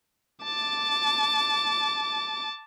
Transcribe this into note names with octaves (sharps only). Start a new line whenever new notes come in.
A5 D6